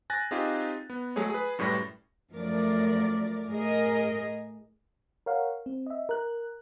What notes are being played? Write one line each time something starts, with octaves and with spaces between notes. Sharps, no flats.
G#5 F#6 A6 A#6
C4 D#4 F4 G4 G#4
B3
F#3 G#3 A3 G#4 C#5
G#4 B4
F#2 A2 G3 B4 C#6 A#6
F#2 F3 A3 A#4 D5
A2 G#4 A#4 D#5
A#4 C#5 F5 F#5
C4
D#5 E5
A#4 F#6